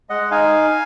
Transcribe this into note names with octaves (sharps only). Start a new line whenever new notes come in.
G#3 D#5 F#5
D#4 F5 G#5